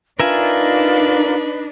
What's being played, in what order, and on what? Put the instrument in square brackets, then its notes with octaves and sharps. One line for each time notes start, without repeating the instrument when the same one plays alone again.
[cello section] D4 D#4 [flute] F4 [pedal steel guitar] A#4 E5 G#5 [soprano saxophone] B4